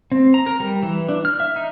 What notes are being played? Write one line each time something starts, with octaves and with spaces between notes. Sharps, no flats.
C4
A#5
A#4
G3
E3
D4
F6
E5
D#4